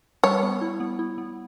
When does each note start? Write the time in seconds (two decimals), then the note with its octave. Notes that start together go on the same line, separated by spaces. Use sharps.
0.24 G3 C#5
0.43 B3
0.61 E4
0.80 B3
0.99 E4
1.18 B3